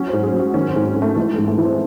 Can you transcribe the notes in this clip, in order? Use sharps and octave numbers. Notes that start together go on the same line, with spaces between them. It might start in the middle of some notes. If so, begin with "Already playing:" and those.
Already playing: F#3 C#4
C5
G#2
G#4
F#3
F#4
D#3 C#4
C4
G#2
C4
G#2
A3
E3 G#3
A3
G#2
A3
E3
C4